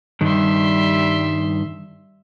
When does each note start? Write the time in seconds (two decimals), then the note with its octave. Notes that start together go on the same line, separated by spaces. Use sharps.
0.21 G2 D#3 G3 E5 C6